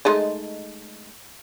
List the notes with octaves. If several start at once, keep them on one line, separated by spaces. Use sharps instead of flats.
G#3 A3 D#4